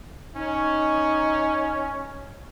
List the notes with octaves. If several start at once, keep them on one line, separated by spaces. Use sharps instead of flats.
C#4 D#4